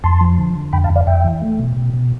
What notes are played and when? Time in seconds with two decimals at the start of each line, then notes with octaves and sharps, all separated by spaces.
0.04 F2 A5 C6
0.21 F3
0.38 D3
0.55 D3
0.73 F2 G5 B5
0.84 F5 A5
0.90 F2
0.96 D5 F5
1.07 F2 E5 G5
1.24 E3
1.42 A3
1.59 B2
1.77 B2
1.94 B2